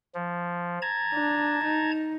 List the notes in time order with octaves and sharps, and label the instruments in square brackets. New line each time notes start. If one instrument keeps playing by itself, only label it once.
[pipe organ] F3
A5 A#5 G#6
[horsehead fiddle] D4
D#4